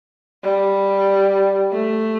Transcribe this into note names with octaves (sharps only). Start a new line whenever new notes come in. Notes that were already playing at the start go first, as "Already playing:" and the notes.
G3
A3